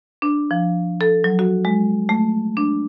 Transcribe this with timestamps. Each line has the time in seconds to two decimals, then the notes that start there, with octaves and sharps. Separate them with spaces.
0.22 D4
0.51 F3
1.01 A4
1.24 F#3
1.39 F#4
1.65 G#3
2.09 A3
2.57 D4